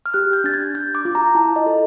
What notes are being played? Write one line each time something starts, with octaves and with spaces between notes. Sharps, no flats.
F6
G4 F#6
G6
D4 A6
G#6
D4 G6
D6
F4
A#5
E4 A5
D#5
A4